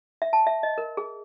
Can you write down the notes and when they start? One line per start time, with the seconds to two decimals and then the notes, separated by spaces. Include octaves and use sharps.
0.22 E5
0.33 A5
0.47 E5
0.63 D#5
0.78 A#4
0.97 G#4